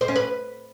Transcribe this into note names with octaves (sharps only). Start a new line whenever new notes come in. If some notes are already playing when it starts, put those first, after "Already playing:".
C5
C#4
B4